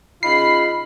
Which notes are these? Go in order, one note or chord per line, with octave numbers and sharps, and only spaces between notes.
C#3 D#4 F4 B5 C7